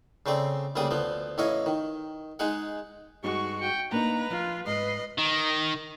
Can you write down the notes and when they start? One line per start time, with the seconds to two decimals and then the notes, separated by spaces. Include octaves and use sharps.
0.26 C#3 A3 C4 D5
0.76 D2 C#3 G3 A#3 D5 D#6
0.91 D2 F3 B3
1.38 A1 E4 C#5 D#5 F5
1.66 D#3
2.39 G#3 D#4 G#4 F#5
3.23 G2 G#3 D#4 F#4 C#6
3.59 G5 C#7
3.92 A#3 D4 D#4 B4 A#5
4.30 F3 F4
4.66 G#2 B4 D#5 C7
5.18 D#3